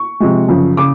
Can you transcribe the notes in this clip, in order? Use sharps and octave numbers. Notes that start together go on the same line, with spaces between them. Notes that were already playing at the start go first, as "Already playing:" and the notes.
Already playing: C#6
C3 F3 G#3
F#2 C#3 F3
C#3 D6